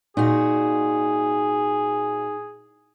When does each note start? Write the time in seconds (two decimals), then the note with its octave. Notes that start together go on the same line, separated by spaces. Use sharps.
0.17 A#2 D#4 F#4 G#4